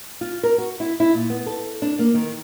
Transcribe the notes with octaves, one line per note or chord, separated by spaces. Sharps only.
F4
A#4
F#4
E4
E4
A#2
B3
A4
D4
A#3
D#3